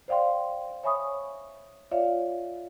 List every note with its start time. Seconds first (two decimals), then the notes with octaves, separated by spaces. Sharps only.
0.08 C5 D5 F5 G5 C6
0.84 C#5 E5 G#5 B5 C#6 D#6
1.91 F4 C#5 D5 E5 F5